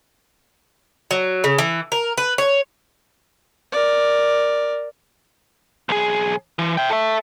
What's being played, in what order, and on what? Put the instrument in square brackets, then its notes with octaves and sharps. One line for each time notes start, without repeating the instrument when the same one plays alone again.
[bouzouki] F#3
C#3
E3
A#4
B4
C#5
[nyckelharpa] A#4 D5
[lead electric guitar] B1 G#4
E3
E5 G5
A4 E5